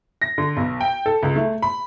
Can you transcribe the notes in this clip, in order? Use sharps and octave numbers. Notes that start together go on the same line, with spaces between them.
A#6
D3
B1
G5
A4
C#2
A3
B5